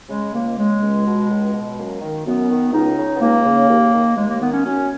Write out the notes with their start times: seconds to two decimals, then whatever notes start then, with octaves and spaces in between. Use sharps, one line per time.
0.09 C#3 G#3
0.33 C#2 A#3
0.57 C#3 G#3
0.81 C#2
1.06 B2
1.30 C#2
1.54 B2
1.77 F#2 A#3
2.01 D#3
2.25 F#2 B3
2.50 D#3
2.73 C#2 D#4
2.97 C#3
3.15 B3
3.21 C#2 A#3
3.45 C#3
3.69 D#2
3.93 D#3
4.17 D#2 G#3
4.29 A#3
4.41 D#3 B3
4.52 C#4
4.65 F#2 C#4